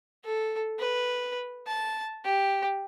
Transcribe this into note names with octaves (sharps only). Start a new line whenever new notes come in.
A4
B4
A5
G4